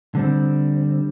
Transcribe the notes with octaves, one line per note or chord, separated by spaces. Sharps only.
D3 G3 C4